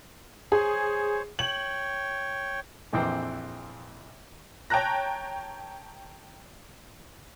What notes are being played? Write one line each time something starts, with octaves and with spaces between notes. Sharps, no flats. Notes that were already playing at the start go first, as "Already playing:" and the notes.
G#4 C5 C#5
C#5 G5 F#7
A#1 F2 E3 C4 G5 D6
C#5 G5 A5 A#5 F#6 A#6